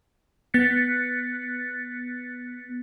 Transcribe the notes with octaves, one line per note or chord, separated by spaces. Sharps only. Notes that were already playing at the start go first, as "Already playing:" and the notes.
B3 F#6 A6 B6 C#7